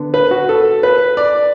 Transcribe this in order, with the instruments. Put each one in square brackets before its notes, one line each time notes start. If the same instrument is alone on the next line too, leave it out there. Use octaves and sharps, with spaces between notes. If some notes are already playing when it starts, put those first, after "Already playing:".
Already playing: [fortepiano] D3 B3
B4
F#4
A4
B4
D5